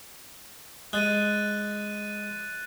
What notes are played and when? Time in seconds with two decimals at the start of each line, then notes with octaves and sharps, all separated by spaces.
0.93 G#3 F#6 A6 D#7